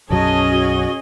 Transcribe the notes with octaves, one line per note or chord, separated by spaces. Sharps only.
B1 F#2 F#3 C#4 G#4 D#5 A5
F#4